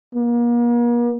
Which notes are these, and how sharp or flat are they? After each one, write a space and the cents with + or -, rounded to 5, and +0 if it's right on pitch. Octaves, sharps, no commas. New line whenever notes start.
A#3 +40